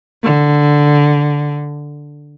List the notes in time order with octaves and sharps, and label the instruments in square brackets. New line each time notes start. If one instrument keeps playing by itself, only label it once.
[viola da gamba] D3